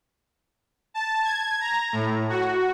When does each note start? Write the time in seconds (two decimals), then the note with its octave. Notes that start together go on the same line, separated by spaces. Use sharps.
0.94 A5
1.24 G#6
1.61 A#5
1.93 A2
2.29 F#4